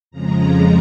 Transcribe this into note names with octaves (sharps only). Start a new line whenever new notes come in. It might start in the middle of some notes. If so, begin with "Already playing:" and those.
F2 C#3 F3 G#3 A#5